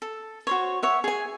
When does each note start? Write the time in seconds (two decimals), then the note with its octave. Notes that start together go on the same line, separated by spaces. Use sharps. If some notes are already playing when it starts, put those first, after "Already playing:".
0.02 A4
0.47 F#4 C5 C#5
0.83 C#5 E5 F#5
1.04 G#4 G#5